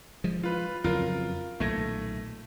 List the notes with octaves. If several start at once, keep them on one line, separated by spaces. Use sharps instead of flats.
F3 G#3
F4 B4
F2 C#3 F#3 F4 A#4
B1 A#2 D#3 A3 G#6 A#6